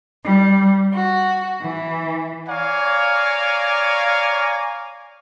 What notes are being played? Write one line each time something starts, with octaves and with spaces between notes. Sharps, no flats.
G3
F#4
E3
C#5 D5 F5 G#5 A#5